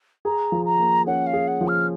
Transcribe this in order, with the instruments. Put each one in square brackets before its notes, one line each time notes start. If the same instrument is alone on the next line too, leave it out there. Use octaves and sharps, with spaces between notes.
[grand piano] G#4 [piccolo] A#5
[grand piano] F3
[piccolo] A#5
[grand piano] A#3
[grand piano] C#4 [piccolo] F#5
[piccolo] F5
[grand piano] G#4
[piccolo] F#5
[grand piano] F3
[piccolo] F6